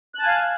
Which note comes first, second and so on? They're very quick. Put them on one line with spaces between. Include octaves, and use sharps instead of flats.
F#6 A5 G#5 F5